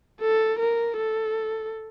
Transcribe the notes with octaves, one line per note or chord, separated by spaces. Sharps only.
A4
A#4
A4